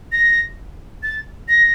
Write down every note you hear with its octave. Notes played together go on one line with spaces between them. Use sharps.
A#6
A6
A#6